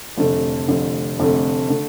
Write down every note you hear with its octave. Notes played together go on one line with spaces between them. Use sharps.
F1 F2 D3 A3
F1 F2 D3 A3
F1 F2 D3 A3
D3 A3